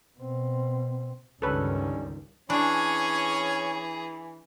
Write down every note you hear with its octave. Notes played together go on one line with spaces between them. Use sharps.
B2 C4
C#2 G2 D3 D#3 G3 C#4 A4 B4
E3 C#4 D4 G#4 C#5